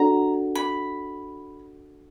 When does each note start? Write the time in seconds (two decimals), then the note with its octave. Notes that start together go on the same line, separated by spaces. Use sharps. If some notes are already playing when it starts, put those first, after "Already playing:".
Already playing: D4 F#4 A4 D5 F#5 A#5
0.55 B5